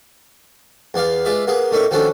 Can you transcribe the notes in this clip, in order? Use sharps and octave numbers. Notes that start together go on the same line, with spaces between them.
E2 B3 D5 F5
G#3 F4 B4 D5 E5
A#3 B3 G#4
A2 A#3 D#4 C#5 E5
D#3 F3 C#4 D4 F#4 A4